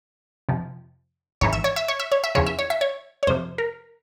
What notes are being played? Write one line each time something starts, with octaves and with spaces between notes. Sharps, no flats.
F2 C3 F3
G#1 G#2 E3 C#5
E5
C#5
E5
C#5
E5
C#5
E5
E2 C#3 F3 C#5
E5
C#5
E5
C#5
C#5
F2 C3 F3 C5
A#4